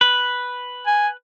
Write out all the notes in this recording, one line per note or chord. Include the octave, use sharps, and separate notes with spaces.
B4
G#5